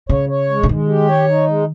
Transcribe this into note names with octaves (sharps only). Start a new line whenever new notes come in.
C#3 C#5
C#5
G#3
C#3
D#3 G#3
G4
C#5
D#4
G#3